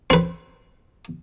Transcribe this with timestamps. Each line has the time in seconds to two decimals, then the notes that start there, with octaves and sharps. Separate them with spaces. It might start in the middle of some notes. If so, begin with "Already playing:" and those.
0.10 C4 B4